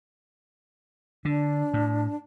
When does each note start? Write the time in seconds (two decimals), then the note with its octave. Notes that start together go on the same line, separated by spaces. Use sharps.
1.25 D3 D4
1.74 A2